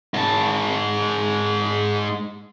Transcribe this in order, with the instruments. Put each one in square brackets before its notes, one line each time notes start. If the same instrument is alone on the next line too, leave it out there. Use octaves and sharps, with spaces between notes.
[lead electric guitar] G#2 A5